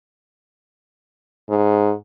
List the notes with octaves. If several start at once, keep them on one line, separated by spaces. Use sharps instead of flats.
G#2